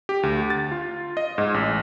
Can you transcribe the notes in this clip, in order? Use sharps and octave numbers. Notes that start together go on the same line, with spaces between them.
G4
D2
A6
F4
D#5
G#2
A1